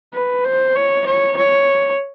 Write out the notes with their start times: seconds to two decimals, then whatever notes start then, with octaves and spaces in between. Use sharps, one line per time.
0.14 B4
0.44 C5
0.75 C#5
1.06 C#5
1.37 C#5